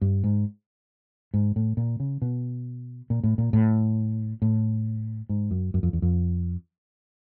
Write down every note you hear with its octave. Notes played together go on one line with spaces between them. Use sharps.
G2
G#2
G#2
A2
A#2
C#3
B2
A#2
A2
A#2
A2
A2
G#2
F#2
F#2
F2
E2
F2